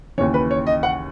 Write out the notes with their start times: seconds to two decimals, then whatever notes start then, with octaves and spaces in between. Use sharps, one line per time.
0.18 D#2 C#3 E3 C#5
0.34 B4
0.51 C#5
0.67 D#5
0.83 F#5